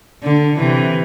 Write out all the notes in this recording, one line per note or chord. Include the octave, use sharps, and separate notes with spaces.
D3
C3 E3